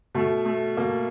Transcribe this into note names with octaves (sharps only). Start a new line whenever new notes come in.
B2 A3
A3
B2 A#3